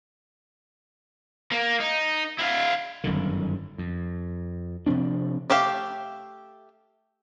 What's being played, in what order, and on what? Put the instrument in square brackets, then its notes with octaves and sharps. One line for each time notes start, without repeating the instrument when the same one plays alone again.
[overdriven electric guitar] A#3
D#4
E4 F5
[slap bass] G1 F#2 D3 D#3
F2
C3 F3 C4 D4
[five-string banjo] A3 G4 E5 F5